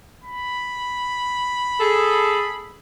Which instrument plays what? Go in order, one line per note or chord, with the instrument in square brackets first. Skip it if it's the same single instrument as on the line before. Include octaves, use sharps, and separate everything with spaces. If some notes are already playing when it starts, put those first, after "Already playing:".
[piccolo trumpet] B5
[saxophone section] G#4 A4